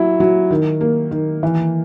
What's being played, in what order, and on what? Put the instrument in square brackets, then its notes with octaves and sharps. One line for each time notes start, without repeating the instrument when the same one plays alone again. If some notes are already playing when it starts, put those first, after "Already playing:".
Already playing: [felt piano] F#3 E4
F#3
D#3
A#3
D#3
E3